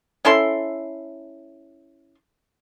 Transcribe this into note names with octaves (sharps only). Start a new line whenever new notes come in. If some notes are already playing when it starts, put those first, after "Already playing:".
C#4 E4 A4 C6